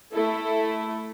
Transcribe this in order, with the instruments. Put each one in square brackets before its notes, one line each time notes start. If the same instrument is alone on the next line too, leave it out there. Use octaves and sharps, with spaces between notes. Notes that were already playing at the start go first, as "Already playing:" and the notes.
[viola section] A3 E4 A4